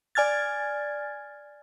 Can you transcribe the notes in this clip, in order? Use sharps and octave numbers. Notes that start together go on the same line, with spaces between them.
D5 G#5 F6 G#6 A6